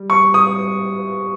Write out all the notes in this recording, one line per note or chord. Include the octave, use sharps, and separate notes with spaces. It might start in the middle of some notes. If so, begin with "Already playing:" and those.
Already playing: G3
C#6
D#6